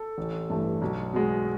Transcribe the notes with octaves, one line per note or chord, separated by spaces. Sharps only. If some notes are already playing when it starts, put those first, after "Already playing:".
Already playing: A4
A1
G2 E3 A3
B1
B2 G#3